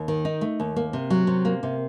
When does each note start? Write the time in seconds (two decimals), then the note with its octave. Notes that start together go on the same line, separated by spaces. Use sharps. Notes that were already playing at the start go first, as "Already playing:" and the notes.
Already playing: D#2
0.08 D#3
0.25 D#4
0.41 A3
0.60 D#2
0.76 A#3
0.93 C3
1.10 F#3
1.27 C3
1.45 A#3
1.63 C3